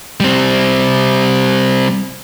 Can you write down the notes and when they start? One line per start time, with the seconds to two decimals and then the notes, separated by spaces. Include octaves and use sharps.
0.20 G3 C4